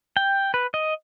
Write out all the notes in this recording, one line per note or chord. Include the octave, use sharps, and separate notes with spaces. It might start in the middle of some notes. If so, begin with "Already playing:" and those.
G5
B4
D#5